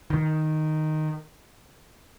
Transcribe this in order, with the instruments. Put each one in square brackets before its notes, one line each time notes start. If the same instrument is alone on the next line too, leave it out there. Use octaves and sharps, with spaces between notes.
[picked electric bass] D#3